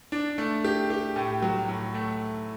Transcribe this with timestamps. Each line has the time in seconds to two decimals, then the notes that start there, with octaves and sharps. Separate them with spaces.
0.12 D4
0.38 A3
0.64 G4
0.90 G4
1.16 A2
1.42 F#3
1.69 A2
1.95 A3